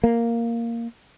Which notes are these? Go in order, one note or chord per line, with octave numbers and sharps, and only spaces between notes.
A#3